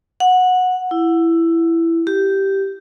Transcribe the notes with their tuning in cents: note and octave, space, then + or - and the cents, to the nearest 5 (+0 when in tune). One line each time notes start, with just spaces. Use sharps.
F#5 -15
E4 +10
G4 -10